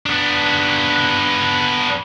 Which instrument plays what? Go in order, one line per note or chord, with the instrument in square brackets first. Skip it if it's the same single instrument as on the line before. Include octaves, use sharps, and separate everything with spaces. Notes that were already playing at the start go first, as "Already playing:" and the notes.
[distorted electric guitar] B3 D4